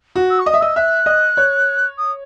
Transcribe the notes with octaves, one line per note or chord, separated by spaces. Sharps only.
F#4
E6
C#6
D#5 D#6
E5
D#5 E6
E5 F#6
D#5
C#5
D#6